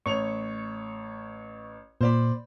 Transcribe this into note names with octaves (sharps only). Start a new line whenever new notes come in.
A1 C#5 C#6 F7
A#2 C5 D5 B5